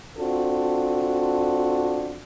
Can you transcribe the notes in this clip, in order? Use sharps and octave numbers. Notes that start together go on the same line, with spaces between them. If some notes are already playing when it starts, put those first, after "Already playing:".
C4 D4 F4 F#4 A4